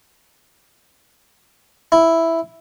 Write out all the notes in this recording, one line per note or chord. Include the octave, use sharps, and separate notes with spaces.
E4